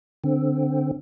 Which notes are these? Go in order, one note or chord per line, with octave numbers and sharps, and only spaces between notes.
D3 C4